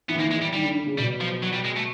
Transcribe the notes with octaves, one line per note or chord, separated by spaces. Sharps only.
E3 B3
D#3
A#3
E3
G#3
G3
D#3 G3
D3
D3
C#3
B2 G3
F3
F#3
G3
G#3
A3